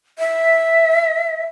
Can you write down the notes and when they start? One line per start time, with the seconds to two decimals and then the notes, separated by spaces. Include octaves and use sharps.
0.19 E5